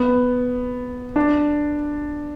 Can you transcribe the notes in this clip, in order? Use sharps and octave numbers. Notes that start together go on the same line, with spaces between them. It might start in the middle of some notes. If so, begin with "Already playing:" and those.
Already playing: B3
D4